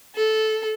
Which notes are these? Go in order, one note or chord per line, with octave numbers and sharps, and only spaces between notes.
A4